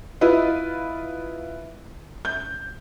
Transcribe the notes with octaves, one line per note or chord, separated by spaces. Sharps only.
E4 F4 B4 D#5
G6